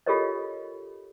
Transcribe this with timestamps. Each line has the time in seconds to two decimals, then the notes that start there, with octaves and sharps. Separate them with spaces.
0.06 F4 G4 A4 A#4 C#5 D#5